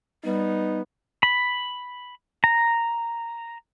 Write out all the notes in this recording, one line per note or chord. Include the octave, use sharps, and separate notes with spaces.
G3 B3 D#4
B5
A#5